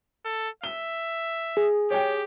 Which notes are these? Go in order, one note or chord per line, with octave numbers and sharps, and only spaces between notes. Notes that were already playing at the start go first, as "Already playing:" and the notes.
A4
E5 G7
G#4
G4 C#5 G5